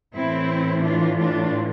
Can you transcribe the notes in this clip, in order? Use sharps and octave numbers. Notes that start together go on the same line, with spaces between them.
A2 E3 C4 E4
D4 F4
D4 F4